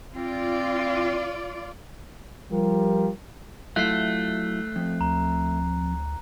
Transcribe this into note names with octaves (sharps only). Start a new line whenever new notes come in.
C4 F4 D5
F3 G3 F4 G4 A#4
F#3 A3 E4 F4 F#6 C7
F2
D2 A#5